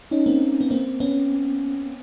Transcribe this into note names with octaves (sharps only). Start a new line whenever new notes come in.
C#4 D#4
A#3 C4
B3
A#3 C4
B3 C#4